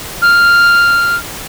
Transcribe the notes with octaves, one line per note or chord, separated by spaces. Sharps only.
F6